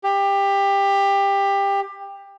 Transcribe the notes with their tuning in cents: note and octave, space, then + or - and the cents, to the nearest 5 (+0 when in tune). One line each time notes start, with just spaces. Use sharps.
G4 +20